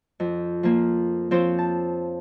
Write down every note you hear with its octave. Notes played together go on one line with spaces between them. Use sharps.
F2
F3 A#3
F3 C4 C5 C#5
A5